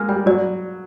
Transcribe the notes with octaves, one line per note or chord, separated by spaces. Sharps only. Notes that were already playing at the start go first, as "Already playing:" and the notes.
Already playing: G#3 A#3 F6
G3 G5
F#3 D5